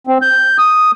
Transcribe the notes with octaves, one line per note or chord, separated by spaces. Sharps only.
C4
G6
D#6